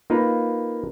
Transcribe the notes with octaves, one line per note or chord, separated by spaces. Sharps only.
A#3 D#4 F4 A#4 B4